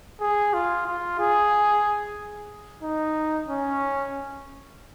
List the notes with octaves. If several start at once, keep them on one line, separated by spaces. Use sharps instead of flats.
G#4
F4
F4
G#4
D#4
C#4